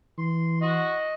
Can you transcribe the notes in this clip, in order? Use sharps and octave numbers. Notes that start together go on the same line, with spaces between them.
E3 C6
F#4 D#5